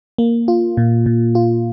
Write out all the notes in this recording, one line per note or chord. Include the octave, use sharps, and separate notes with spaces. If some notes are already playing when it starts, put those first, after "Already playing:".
A#3
F4
A#2
A#2
F4